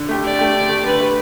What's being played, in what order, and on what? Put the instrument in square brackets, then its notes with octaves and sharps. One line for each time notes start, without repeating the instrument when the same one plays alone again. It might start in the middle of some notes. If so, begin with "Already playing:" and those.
Already playing: [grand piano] D3
A3 G4
[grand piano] D3 [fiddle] D5
[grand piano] A3 G4
D3
A3 G4
[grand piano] D3 [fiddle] B4
[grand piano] A3 G4